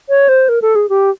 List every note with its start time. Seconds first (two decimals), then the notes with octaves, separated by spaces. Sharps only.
0.09 C#5
0.29 C5
0.49 A#4
0.62 A4
0.75 G#4
0.89 G4